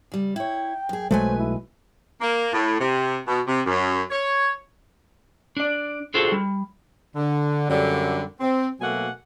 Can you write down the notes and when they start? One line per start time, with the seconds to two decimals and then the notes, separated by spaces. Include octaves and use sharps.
0.12 C#3 G3
0.36 E4 C#5 G5
0.89 F#2 G#4
1.11 B1 F#3 G#3 A3 B4 C5 G#5
1.38 E4
2.20 A#3
2.53 A2
2.80 C3
3.27 B2
3.47 C3
3.66 F#2
4.10 C#5
5.57 D4 D5
6.14 D4 F4 F#4 G#4 A4 C5
6.32 G3
7.16 D3
7.69 F#2 D3 G3
8.40 C4
8.80 B2 F#3 A3 A#3 F#5 G#5